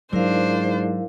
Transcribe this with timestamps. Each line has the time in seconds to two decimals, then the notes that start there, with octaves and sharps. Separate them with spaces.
0.13 G#2 F#3 D4 E4 A#4 C5 F5